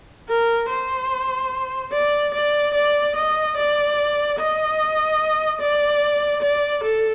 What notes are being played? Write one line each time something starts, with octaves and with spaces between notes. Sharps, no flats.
A#4
C5
D5
D5
D5
D#5
D5
D#5
D5
D5
A4